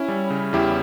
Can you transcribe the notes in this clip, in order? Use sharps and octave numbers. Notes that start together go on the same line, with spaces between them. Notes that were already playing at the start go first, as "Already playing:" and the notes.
Already playing: C#4 E4
G3
C#3
E2 E4 G4